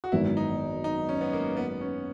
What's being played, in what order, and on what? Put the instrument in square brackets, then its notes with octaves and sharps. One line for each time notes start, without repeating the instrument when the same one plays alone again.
[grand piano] F#4
[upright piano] G#1 F#2 D#3 G#3 B3 [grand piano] E4
[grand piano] D#4
D#4
C#4
B3
A#3
B3
C#4